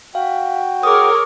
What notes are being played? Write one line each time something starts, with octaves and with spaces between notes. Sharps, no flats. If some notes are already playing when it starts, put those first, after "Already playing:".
F#4 F5 G5
G#4 A#4 C#5 D6 D#6